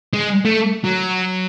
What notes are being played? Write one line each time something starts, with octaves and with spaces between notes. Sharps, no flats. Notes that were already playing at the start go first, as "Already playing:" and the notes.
G#3
A3
F#3